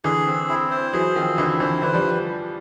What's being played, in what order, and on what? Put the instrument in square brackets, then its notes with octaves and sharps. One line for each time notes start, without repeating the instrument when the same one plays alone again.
[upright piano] D3 E3 [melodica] G#4
[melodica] C4
E4
C5
[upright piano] E3 F#3 [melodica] G#4
[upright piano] D#3 F3 [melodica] C4
[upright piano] D3 E3 [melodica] E4
[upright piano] D3 E3 [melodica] C5
[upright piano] D3 E3 [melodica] B4
[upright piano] F3 G3